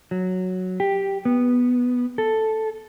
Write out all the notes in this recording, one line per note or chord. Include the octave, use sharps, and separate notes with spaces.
F#3
G4
B3
A4